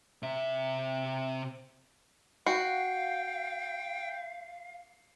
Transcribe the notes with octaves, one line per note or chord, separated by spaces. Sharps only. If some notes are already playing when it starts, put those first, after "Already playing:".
C3 E5
F#4 F5 G5 C7 C#7